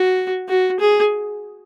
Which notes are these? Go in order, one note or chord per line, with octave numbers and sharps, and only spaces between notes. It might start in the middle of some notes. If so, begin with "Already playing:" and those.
Already playing: F#4
F#4
G#4